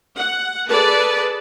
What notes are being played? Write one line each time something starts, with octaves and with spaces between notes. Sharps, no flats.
F#5
G#4 A4 B4 D5 A5